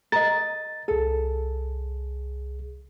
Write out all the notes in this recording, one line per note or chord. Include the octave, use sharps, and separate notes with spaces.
A#4 D#5 A6
C2 G#4 A4